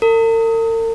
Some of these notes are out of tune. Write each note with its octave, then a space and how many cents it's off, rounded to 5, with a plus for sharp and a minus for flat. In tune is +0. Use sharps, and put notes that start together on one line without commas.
A#4 -45